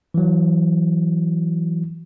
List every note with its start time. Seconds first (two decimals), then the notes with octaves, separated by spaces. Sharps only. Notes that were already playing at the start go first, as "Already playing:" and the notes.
0.14 E3 F#3